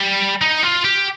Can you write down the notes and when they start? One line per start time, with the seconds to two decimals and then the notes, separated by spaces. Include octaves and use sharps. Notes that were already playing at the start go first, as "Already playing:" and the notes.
Already playing: G3
0.42 D#4
0.63 F4
0.84 G4